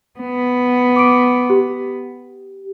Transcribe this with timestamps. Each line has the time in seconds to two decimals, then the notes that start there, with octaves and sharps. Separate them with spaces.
0.19 B3
0.96 D6 D7
1.50 G4